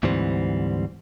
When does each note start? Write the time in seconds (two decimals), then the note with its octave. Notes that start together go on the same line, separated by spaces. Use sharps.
0.03 D2 G#2 E3 G3 C4